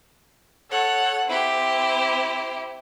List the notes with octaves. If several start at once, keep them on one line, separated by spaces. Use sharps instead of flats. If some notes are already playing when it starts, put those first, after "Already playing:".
A4 C#5 F#5
C4 E4 G4